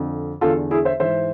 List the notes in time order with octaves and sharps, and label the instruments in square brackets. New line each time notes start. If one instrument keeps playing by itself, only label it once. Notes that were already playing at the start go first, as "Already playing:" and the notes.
Already playing: [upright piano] F2 D3
E2 D3 F4 A4
E4 G#4
C5 E5
G#2 E3 C5 E5